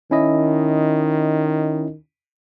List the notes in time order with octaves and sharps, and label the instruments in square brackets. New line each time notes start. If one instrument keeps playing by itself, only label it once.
[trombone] D#3 [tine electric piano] C#4 E4 D#5